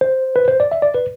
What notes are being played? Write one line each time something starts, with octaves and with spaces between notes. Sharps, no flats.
C5
B4
C5
D5
E5
D5
B4